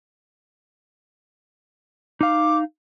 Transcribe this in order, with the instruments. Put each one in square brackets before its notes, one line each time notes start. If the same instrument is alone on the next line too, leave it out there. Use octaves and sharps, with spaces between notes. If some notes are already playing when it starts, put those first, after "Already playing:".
[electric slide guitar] D#4 F5 [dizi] D6